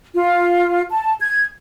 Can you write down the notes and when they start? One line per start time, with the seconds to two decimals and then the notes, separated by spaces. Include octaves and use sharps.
0.13 F4
0.90 A5
1.20 G#6